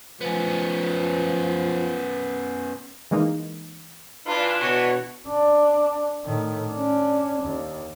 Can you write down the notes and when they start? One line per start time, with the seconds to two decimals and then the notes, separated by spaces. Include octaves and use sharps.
0.21 F3 B3 C#4
3.11 E3 G#3 A#3 D#4
4.27 E3 D4 F4 B4
4.62 B2 F#4 C#5
5.27 D4
6.25 A2 D#3
6.71 C#4 D4
7.42 D#2